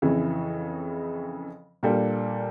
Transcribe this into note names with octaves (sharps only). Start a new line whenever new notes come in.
F2 C#3 E3
A#2 G3 A#3 D4 A4